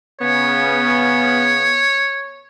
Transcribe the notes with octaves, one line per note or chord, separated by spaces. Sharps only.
C#3 B3 C#5